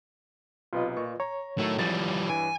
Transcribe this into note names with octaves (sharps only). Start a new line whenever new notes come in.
B1 C3 F4 B4 D#5
A#2 C#6
C#5 A#5
A2 D#3 F#3 A3 A4
G#1 E3 F3 G3 A6
G2 E3 G#5 D7